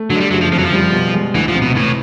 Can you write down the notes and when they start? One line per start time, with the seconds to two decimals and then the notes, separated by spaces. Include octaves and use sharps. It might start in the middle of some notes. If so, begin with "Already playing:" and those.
Already playing: A3
0.10 D3 F#3
0.16 G#3
0.20 G3
0.31 F#1 F#3
0.41 F3
0.51 F2 F3
0.58 F#3
0.65 F3
0.72 G3
0.92 B2
1.14 G#3
1.34 D2 E3
1.48 F3
1.55 C3
1.62 B2
1.76 A2 E3